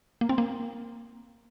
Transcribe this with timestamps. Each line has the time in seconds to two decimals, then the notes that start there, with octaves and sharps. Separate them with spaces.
0.21 A#3
0.29 C4
0.38 A#3